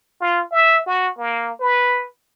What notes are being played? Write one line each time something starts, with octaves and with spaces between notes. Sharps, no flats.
F4
E5
F#4
A#3
B4